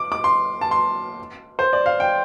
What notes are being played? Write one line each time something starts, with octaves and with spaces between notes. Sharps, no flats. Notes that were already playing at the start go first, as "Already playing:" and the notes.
Already playing: D6
D6
C6
A5
C6
C5
D5
F5
G5